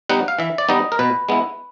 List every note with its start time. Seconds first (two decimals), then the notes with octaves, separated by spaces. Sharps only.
0.09 G3 B3 D#4 F#5
0.28 F5
0.39 E3 E5
0.58 D5
0.69 G3 B3 D#4 D#5
0.92 A#4
0.99 B2 B4
1.29 G#3 B3 E4